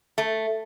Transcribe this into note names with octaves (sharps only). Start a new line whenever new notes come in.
A3